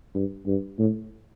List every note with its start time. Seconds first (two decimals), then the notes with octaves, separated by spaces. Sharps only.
0.15 G2
0.47 G2
0.79 A2